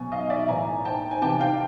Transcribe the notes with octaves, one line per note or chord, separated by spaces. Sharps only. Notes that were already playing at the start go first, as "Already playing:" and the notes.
Already playing: B2 F#3 G#5
D#5 F5
D5 E5
A2 E3 G#5 A#5
G5 A5
G#5
C3 E3 G5 A5
F5 G5